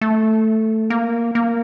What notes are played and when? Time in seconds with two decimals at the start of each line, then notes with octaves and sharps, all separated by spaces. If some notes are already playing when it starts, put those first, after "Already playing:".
0.01 A3
0.90 A#3
1.35 A#3